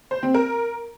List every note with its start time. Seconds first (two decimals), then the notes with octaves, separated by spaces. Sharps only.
0.11 C5
0.23 C4
0.34 A#4